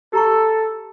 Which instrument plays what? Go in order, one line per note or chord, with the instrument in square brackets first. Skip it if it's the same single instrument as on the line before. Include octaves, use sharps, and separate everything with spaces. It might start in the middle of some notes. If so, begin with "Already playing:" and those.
[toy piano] G4 A#5 C#6 [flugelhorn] A4